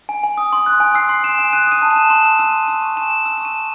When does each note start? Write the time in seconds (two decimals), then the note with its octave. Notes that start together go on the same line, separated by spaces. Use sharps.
0.09 G#5
0.24 G#5
0.38 D#6
0.53 C6
0.66 F#6
0.80 G#5
0.95 E6 C7
1.09 C6
1.23 G#5 E7
1.39 G#5
1.53 F#6 D#7
1.67 D#6 D#7
1.82 A5
1.91 E7
1.96 A5
2.10 C6 E7
2.25 E6
2.38 E6 D#7
2.53 C6
2.68 E6 D#7
2.82 C#6
2.96 G#5 E7
3.12 G#5
3.25 E6
3.38 E7
3.40 C#6 D#7
3.55 A5